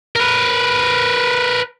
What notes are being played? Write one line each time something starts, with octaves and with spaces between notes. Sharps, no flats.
A#4 B4